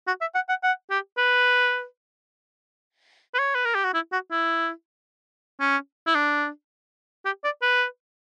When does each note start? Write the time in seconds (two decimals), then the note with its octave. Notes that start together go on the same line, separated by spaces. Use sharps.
0.07 F#4
0.21 E5
0.35 F#5
0.49 F#5
0.63 F#5
0.90 G4
1.18 B4
3.34 B4
3.39 C#5
3.55 B4
3.65 A#4
3.75 G4
3.84 F#4
3.94 E4
4.12 F#4
4.31 E4
5.60 C#4
6.07 E4
6.15 D4
7.25 G4
7.44 D5
7.62 B4